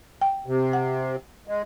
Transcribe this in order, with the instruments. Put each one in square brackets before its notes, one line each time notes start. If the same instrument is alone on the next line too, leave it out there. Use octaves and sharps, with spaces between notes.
[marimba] G5
[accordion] C3
[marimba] F#5
[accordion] G#3